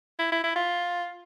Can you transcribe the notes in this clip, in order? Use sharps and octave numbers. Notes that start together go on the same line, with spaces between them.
E4
E4
E4
F4